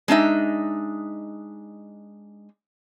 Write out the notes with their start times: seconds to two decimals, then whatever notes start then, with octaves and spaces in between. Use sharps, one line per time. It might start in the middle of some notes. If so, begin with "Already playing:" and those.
0.08 G#3 D4 D#4 E5